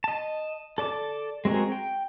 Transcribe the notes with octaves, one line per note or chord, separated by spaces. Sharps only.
D#5 A5
A4 D5 A5 D6
G#3 C4 F#4 G#4 A#4
G5